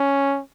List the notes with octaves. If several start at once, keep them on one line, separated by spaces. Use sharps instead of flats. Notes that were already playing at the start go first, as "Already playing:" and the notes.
Already playing: C#4